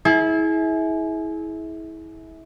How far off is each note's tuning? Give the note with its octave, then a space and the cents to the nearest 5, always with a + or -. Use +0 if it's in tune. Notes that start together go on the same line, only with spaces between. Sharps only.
E4 -25 G#4 +30